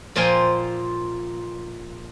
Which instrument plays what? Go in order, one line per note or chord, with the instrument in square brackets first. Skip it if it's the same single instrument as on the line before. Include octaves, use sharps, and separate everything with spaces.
[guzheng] A#2 F3 F4 C5 G5 G#5